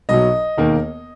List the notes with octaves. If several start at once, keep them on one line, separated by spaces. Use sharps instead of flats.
B1 B2 F#3 D#5
E1 D#2 D#3 A#3